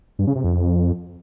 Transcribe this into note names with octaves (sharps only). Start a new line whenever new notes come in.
G2
C#3
C3
F2